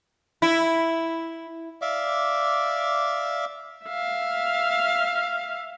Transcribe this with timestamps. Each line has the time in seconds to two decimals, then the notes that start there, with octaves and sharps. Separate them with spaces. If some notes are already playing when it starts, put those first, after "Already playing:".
0.42 E4
1.82 D5 E5 F5 D6
3.86 E5 F5